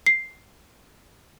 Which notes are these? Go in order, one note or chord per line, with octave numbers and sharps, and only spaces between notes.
C7